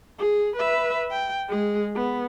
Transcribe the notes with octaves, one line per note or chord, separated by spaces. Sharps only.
G#4
B4 E5
G5
G#3 G#4
B3